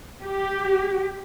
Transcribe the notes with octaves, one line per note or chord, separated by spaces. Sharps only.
G4